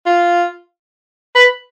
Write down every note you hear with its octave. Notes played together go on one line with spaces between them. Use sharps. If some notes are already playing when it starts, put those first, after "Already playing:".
F4
B4